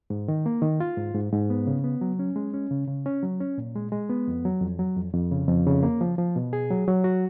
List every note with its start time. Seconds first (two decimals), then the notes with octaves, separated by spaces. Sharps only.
0.10 G#2
0.28 D#3
0.46 A#3
0.62 D#3
0.80 F4
0.97 G#2
1.14 G#2
1.33 G#2
1.50 B3
1.67 C#3
1.84 B3
2.01 F#3
2.19 C#4
2.36 G#3
2.54 C#4
2.71 C#3
2.88 C#3
3.06 C#4
3.23 F#3
3.40 C#4
3.58 A#2
3.76 G#3
3.92 G#3
4.09 B3
4.28 F2
4.45 F#3
4.61 F2
4.79 F#3
4.96 F2
5.13 F2
5.31 C#3
5.48 F2
5.66 C#3
5.83 A#3
6.01 F3
6.18 F3
6.36 B2
6.53 G#4
6.71 F#3
6.88 F#3
7.04 F#4